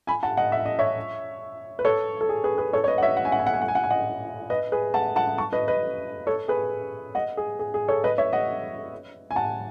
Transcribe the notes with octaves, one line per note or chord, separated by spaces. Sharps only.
G#5 B5
F#5 A5
D#5 F#5
E5
D#5
C#5 E5
B4
A4 C#5
A4
G#4
G#4 B4
G#4 B4
A4 C#5
C#5
B4 D#5
F#5
C#5 E5
F#5
G#5
F#5
G#5
F#5
G#5
F#5
G#5
F#5
G#5
D#5 F#5
B4 D#5
G#4 B4
F#5 A5
F#5 A5
A5 C#6
B4 D#5
B4 D#5
A4 C#5
G#4 B4
D#5 F#5
G#4
G#4
G#4
A4 C#5
B4 D#5
C#5 E5
D#5 F#5
G#5
F#5 A5